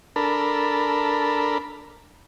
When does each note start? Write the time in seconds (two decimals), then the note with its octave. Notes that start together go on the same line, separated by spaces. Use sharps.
0.16 D4 A4 A#4 B5